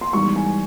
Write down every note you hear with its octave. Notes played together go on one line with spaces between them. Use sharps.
C6
G#2 E3 G3 B3 D#4 C#6
G#5